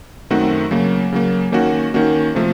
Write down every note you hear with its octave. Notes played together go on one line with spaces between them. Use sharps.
F#2 D#3 A3 C4 F#4
C#3 F#3 A#3
C#3 F#3 A#3
D#3 A#3 C#4 F#4
D#3 A#3 C#4 F#4
C3 F3 A3